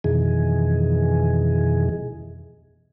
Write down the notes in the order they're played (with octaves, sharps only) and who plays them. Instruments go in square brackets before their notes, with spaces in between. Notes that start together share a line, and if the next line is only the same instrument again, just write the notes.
[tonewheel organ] F2 B2 D#3 E3 G#4